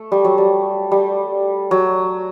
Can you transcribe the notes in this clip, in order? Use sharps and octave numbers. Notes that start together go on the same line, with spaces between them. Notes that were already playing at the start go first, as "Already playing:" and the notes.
Already playing: A3
G3
F#3
G3
G3
F#3